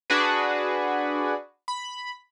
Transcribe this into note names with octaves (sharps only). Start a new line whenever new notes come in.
D4 F#4 G#4 B4
B5